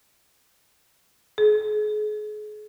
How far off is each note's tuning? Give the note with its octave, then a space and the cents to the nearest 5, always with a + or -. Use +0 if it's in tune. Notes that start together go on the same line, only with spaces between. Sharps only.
G#4 +35